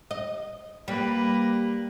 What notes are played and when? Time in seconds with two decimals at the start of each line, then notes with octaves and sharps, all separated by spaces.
0.11 D#5
0.88 G3 A#3 B4